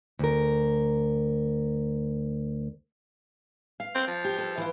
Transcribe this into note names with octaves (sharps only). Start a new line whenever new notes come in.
D2 A#4
F5
C4
F3
G4
A4
E3 F4